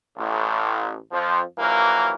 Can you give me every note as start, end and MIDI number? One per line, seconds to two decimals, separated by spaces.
0.17 0.96 33
1.12 1.41 41
1.12 1.41 53
1.58 2.15 34
1.58 2.15 52
1.58 2.15 54
1.58 2.15 58
1.58 2.15 70